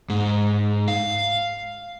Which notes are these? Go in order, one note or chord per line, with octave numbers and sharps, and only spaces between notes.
G#2
F5